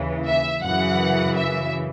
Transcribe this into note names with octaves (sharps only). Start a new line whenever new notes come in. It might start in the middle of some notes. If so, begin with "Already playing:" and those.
Already playing: D#2 C#3 E3
E5
F#2 C#3 E3 F#5
E5